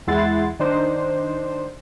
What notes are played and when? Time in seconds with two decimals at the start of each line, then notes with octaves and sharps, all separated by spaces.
0.07 E2 G#3 E4 F#5 C6 A6
0.59 D#3 D4 D#4 C5